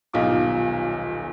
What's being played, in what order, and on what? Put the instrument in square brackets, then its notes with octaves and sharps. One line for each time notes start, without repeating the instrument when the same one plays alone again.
[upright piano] D#1 B1 D#4 F4 D6